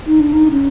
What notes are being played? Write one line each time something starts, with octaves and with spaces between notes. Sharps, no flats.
D#4
D4
D#4
C#4